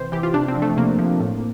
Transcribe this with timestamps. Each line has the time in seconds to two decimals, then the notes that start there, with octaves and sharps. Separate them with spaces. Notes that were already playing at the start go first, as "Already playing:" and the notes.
Already playing: C3 E3 C5
0.12 E3 G4
0.23 F4
0.34 C3 D4
0.48 C4
0.55 F3
0.62 A3
0.77 C3 A#3
0.99 F3
1.20 A2